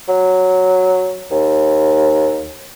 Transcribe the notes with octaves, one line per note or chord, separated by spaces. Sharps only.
F#3
D#2